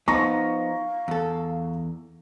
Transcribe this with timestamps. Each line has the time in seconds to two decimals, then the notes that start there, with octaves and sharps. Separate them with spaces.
0.08 F3 B3 D#4 F5 A#5 C#6 A#6
1.08 E2 A4